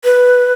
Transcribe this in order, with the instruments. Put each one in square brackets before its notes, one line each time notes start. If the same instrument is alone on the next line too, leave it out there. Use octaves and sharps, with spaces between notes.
[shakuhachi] B4